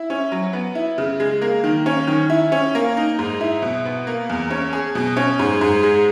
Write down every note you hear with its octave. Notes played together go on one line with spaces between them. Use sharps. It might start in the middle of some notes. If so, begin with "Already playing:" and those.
Already playing: E4
C#4
F#3
B3
E4
C#3
G#3
A#3
D#3
C#4
D#3
E4
C#4
A#3
D#4
G#2
E4
B2
B3
A#3
E2
C#4
G#4
B2
C#4
G#2
G#2
G#3